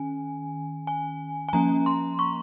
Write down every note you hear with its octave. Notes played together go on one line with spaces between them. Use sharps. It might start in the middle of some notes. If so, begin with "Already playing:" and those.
Already playing: D#3 C#4 G#5
G#5
G#5
F3 A#3 C#4 A#5
C6
C#6